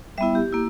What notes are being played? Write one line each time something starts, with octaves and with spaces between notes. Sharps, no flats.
G3 B3 E4 E5
G4
A#3 E4